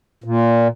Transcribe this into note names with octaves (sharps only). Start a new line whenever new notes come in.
A#2